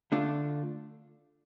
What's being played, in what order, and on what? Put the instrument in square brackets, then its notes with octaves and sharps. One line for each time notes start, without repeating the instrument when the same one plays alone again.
[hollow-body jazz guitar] D3 A3 D4 F4